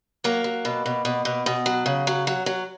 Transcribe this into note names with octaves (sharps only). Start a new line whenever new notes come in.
F#3 A#3
F#3
B2
B2
B2
B2
B2
F#3
C#3
F#3
F#3
F#3